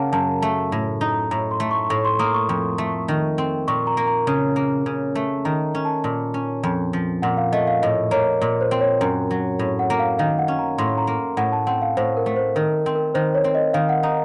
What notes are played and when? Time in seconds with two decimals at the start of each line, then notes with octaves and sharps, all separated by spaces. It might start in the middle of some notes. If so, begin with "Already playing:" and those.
Already playing: C#3 A#3 F5 F#5 A5
0.13 F#2 A5
0.42 A3 A5
0.72 A2
1.01 D#4
1.31 A2 A#5
1.51 C6
1.60 A3
1.71 C#6
1.90 A2 C#6
2.05 C6
2.19 A#3 D#6
2.34 C#6
2.49 F2
2.78 A3
3.08 D#3
3.38 C4
3.68 A#2 C#6
3.87 A#5
3.97 A#3
4.07 A#5
4.27 C#3
4.56 A#3
4.86 C#3
5.15 A3
5.45 D#3 A#5
5.75 C#4
5.85 A5
6.04 A#2
6.34 C#4
6.63 F2
6.93 F3
7.22 A#2 F#5
7.37 F5
7.52 A3 D#5
7.67 F5
7.82 A2 D#5
8.11 A#3 C#5
8.41 A#2
8.61 C5
8.71 C4
8.81 C#5
9.01 F#2
9.31 F#3
9.59 A2
9.79 F#5
9.90 A#3
9.99 F5
10.19 D#3 F5
10.38 F#5
10.48 C#4
10.59 A#5
10.78 A2 C6
10.98 A#5
11.07 A#3
11.37 A2 F#5
11.52 A5
11.67 C4 F#5
11.82 F5
11.97 A2 C5
12.17 A#4
12.26 A3
12.36 C5
12.56 D#3 A#4
12.86 C4
12.95 A#4
13.14 D#3 C5
13.35 C#5
13.44 C4
13.55 D#5
13.74 D#3 F5
13.89 F#5
14.03 D#4